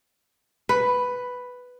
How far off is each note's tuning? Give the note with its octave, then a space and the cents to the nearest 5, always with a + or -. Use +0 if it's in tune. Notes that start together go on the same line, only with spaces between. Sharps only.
B4 +5